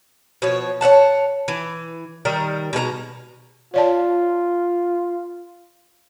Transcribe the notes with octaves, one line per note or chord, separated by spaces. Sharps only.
B2 F3 C#5
C#5 E5 F#5 A5
E3
D#3 G3 A#4
B2 G#3 A#4 A#5
F4 C#5 D5 A5